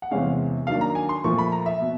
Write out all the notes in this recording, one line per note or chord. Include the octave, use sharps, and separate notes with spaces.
F#5
E2 C3 E3 G#3 C#4 F5
D#3 F#3 A#3 D4 F5
A#5
G#5
C6
A#2 F3 A3 C#6
B5
A#5
E5
B2